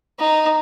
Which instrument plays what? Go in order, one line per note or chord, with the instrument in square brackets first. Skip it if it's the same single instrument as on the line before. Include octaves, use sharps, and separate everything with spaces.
[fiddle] D#4